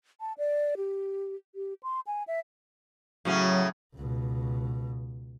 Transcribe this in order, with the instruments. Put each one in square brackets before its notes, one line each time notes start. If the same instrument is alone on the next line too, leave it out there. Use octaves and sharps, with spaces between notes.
[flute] A5
D5
G4
G4
C6
G#5
E5
[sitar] A2 C#3 C#4 [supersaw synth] F#3
[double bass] C#2 B2